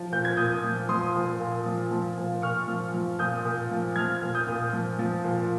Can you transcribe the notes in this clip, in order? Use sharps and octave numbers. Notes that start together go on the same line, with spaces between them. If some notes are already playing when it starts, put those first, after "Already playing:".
Already playing: F3
A#2 G6
G#6
A#2 D#6 G6
F3
F3 C6 D#6
A#2
A#2
F3
F3
A#2
A#2 C#6 F6
F3
F3
A#2 D#6 G6
A#2
F3
F3 F6 G#6
A#2
D#6 G6
A#2
F3
F3
A#2